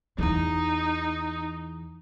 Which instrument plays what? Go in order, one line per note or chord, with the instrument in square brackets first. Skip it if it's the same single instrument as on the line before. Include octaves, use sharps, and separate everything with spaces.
[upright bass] E2 E3 [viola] D#4